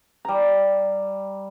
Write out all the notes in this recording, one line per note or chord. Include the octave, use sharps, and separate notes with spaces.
G3 A#5